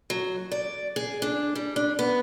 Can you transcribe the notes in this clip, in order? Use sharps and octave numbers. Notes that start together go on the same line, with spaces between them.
F#3
D5
G#4
D4
G3
D4
B3